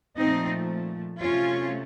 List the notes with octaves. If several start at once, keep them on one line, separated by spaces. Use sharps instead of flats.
A#2 F3 A3 C4 D#4
C3 F#3 A3 C#4 F4